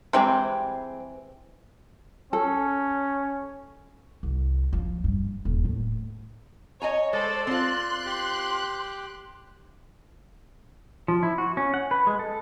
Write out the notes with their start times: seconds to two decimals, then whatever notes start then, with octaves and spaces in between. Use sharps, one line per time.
0.13 C3 E3 G3 G#3 C4 C5
2.33 C#4 A4
4.23 C2
4.73 F3
5.04 G2
5.45 D#1
5.65 A2
6.82 C#5 D#5 G#5 A#5
7.13 G#3 A4 C5 D5
7.47 C4 F4 C6 F#6
8.06 G4
11.08 F3
11.23 E4
11.38 F#4
11.57 C#4
11.74 F#5
11.91 B4
12.07 G#3
12.19 A4